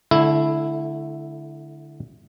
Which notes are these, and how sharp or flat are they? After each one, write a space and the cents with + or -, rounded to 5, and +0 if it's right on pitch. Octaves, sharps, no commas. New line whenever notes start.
D3 +0 A3 -30 E4 +0